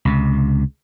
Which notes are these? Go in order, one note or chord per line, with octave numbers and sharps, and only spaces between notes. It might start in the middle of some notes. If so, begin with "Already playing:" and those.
C#2 C3